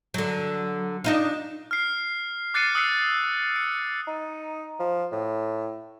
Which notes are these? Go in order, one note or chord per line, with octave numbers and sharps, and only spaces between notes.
D3 F#3
D4 D#4 F4
F6 C7
D6 F#6 A6 C7 C#7 D#7
D#6 E6 F#6 C7 C#7
C#7
D#4
F3
A2